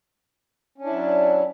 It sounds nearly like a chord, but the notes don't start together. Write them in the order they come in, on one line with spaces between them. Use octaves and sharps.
C#4 D4 E4 F#3